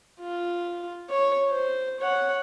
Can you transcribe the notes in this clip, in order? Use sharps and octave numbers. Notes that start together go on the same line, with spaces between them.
F4
C#5
C5
C#5 F#5